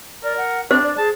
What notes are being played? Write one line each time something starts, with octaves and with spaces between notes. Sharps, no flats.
A#4 D5
F#5
C4 D4 C5
D5
G#4 A5